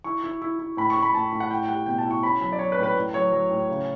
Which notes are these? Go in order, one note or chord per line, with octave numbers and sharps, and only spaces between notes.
E4 C#6
E4
E4
E4
A2 B5
C#6
A2
B5
A2 A5
A2
F#5
E4 G5
G5
G3 F#5
B2 G5
A5
E4
C#6
C#4 B5
F#3 B5
D5
F#3 C#5
B4
A2
B4
A2
F#3 C#5
F#3
A2
C#3